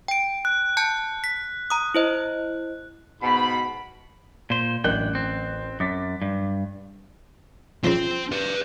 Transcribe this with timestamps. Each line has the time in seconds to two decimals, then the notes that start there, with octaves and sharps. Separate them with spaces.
0.08 G5 D7
0.45 F#6
0.77 A5 G6 C#7
1.24 B6
1.70 A#5 D#6
1.95 E4 C5 D#5
3.21 G#2 B2 B5
4.50 A#2 C5
4.84 A1 F#2 D4 A#4 G5 F#6
5.15 C4
5.80 F#2 D6 A6 B6
6.22 G2
7.84 C#3 F3 C4
8.32 B4 D5